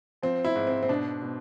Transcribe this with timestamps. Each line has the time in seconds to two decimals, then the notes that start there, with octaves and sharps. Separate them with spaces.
0.23 F3 C4
0.44 E4
0.55 G#2
0.67 C4
0.83 C4
0.89 B2 D4
1.22 B2